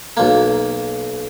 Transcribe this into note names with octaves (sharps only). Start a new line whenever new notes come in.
B1 A#3